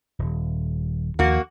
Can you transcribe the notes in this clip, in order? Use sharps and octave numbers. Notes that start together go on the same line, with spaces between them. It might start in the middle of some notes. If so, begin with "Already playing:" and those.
D#1
D#2 F3 A#3 F#4